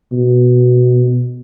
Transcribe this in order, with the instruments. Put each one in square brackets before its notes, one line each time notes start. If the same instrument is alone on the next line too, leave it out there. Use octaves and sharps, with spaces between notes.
[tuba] B2